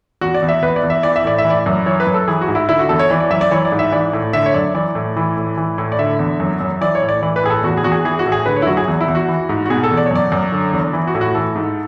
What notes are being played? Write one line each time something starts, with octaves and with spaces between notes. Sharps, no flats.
E2 F#4
D5
E2
E5
E2 B4
D5
E2
E5
E3 D5
E5
A2 D5
E5
E3
D5
F#2
E3 C#5
B4
F#2
A4
E3 G#4
F#4
G#2
E4
D3 E4
F#4
E2 A4
C#5
E3 D5
D5
F#2 E5
D5
E3 C#5
D5
G#2
E5
E3 D5
A2
D3 E5
C#5
F#2 D5
E3 D5
A2
E3
A2
E3
A2
D5
D3 E5
E2
F#2
F#2
E3 D5
C#5
A2
D5
E3 D5
B4
A2 G#4
A4
E2 F#4
G#4
E2 F#4
G#4
E3 G#4
F#4
A2
G#4
D3 B4
C#5
E4
F#2 F#4
G#4
E2
E4
E2
F#4
E3
G#2
F#4
B2 G#4
A4
E2
D5
C#5
F#2 D5
F#2
D3
E2
E3
F#4
A2
F#4
E3 A4
G#2